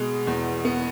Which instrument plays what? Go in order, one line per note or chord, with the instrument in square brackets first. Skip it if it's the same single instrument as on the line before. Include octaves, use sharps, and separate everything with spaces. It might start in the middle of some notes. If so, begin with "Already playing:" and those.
Already playing: [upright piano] B2 G#3
E2
B3